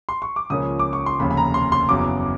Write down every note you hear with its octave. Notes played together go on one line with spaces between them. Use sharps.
C6
C#6
D6
C#2 C#3 F3 A#3 C#4 D#6
D6
C#6
C6
F1 D#2 C#3 B5
B5
A#5
C6
C6
F#1 E2 C#3 F#3 D6